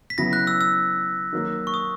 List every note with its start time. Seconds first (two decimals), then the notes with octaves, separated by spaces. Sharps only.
0.10 B6
0.18 C#3 F#3 B3 E4 A#6
0.33 F#6
0.47 E6
0.61 E6
1.33 D#3 F#3 A#3
1.67 C#6
1.74 D#6